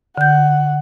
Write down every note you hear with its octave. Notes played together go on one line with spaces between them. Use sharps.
D3 F#5 G6